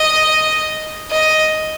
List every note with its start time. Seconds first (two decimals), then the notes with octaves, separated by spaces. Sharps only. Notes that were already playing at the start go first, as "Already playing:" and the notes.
Already playing: D#5
1.11 D#5